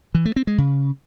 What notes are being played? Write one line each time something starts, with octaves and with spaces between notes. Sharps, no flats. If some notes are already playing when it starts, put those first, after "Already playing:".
E3
A3
C4
G#3
C#3